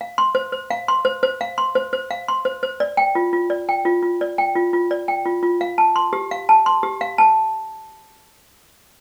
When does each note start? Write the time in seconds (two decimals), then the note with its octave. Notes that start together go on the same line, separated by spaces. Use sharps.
0.01 F5
0.18 C6
0.35 C5
0.52 C5
0.71 F5
0.88 C6
1.05 C5
1.23 C5
1.41 F5
1.58 C6
1.75 C5
1.93 C5
2.11 F5
2.28 C6
2.45 C5
2.63 C5
2.80 D5
2.97 G5
3.15 F4
3.33 F4
3.50 D5
3.69 G5
3.85 F4
4.02 F4
4.21 D5
4.38 G5
4.56 F4
4.73 F4
4.91 D5
5.08 G5
5.25 F4
5.43 F4
5.61 F5
5.78 A5
5.96 C6
6.13 G4
6.31 F5
6.49 A5
6.66 C6
6.83 G4
7.01 F5
7.18 A5